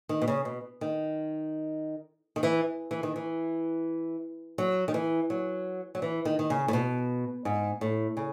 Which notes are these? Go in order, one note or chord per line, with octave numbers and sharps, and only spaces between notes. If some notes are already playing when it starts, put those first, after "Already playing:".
D#3
B2
C#3
B2
D#3
D#3
E3
E3
D#3
E3
F#3
D#3
E3
F#3
F#3
E3
D#3
D#3
C#3
A2
B2
G#2
A2
C#3